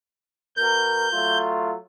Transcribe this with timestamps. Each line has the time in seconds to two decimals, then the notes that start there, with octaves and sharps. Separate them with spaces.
0.57 B2 A#4 G6
1.13 F#3 A3 F4